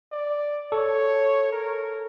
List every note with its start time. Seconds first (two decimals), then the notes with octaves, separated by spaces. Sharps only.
0.12 D5
0.72 A4 C#5
1.52 A#4